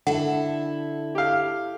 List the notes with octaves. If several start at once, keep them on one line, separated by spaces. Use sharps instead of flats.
D3 E4 A4 F#5
G4 F5